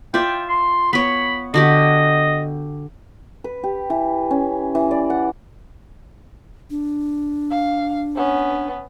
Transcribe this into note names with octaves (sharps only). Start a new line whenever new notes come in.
F4 D5 E5 G5
C6
B3 C#5 B5
D3 F#4 G4 D#5
B4
G4
E3
C#4
E3
D5
F#5
D4
F5
B3 C#4